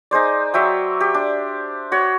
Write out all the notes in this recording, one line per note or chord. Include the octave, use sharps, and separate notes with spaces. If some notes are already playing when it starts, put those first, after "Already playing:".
D#4 G#4 C5 D5
F#3 E5 G5
G4
D4
F#4 C#5